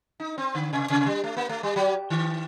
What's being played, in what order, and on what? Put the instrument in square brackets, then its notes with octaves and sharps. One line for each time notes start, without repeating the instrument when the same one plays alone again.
[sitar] D#4
C4
D3
C3
C3
G3
A3
A#3
A3
G3
F#3
D#3